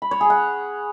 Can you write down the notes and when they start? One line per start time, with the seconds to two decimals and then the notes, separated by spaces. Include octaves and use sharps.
0.02 B5
0.11 C#5
0.21 G#4
0.30 F#5